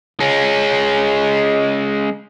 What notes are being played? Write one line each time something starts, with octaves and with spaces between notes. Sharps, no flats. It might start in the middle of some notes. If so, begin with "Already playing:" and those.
G#3 C#4